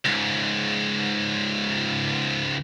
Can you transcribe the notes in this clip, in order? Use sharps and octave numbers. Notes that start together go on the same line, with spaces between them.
C#2 G#2